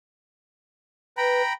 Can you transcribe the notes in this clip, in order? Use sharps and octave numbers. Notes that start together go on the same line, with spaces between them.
B4 G5 A#5 B5